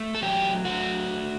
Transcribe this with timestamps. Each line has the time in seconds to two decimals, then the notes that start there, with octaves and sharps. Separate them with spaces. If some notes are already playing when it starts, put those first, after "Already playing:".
Already playing: A3
0.15 A4
0.23 F#3 G4
0.65 A3 F#4